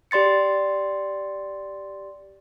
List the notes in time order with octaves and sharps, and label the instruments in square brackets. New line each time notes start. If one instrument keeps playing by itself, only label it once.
[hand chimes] G4 D5 C6 A6 C#7